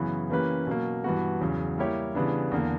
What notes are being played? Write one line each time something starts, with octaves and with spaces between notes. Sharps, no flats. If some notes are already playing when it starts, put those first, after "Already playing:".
Already playing: F#2 C#3 E3 B3
E3 A#3 C#4 G4 B4
B2 F#3 A#3
G2 E3 B3 F#4
E2 C#3 F#3
G3 A#3 E4 G4 C#5
C#3 E3 G3 B3 D4
E2 D3 A#3